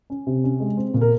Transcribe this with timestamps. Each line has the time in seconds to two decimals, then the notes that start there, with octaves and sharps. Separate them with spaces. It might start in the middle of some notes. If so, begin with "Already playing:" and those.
0.10 C#4
0.27 C3
0.44 C#4
0.60 G#3
0.77 C4
0.94 A#2
1.01 A#4